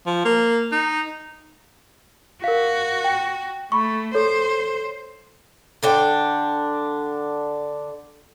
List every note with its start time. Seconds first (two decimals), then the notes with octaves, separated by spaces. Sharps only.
0.06 F3
0.25 A#3
0.72 D#4
2.44 F#4 A#4 F5
3.04 G5
3.72 A3 B5 C#6
4.15 A4 C5 C#5
5.83 D3 D4 G5